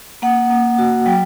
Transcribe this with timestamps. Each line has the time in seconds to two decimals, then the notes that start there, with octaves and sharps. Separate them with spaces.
0.22 A#3 F#5
0.50 A#3
0.78 F#4
1.06 F#3 G5